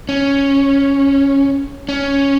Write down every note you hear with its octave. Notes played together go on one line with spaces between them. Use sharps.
C#4
C#4